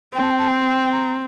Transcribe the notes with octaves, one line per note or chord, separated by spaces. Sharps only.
C4 G5
A5
G5
A5
G5
G5
A#5